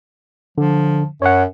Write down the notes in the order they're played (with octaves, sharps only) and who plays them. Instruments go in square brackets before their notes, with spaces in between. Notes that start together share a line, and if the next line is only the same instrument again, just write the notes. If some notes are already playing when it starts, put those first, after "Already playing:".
[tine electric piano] D3 [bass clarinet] F3
[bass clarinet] F#2 [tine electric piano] C#5 F#5